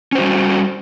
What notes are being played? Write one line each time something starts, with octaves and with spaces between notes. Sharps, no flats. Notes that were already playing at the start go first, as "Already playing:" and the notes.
G3 C#4 F#4 C5